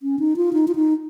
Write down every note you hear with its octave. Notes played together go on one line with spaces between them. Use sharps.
C#4
D#4
F4
D#4
F4
D#4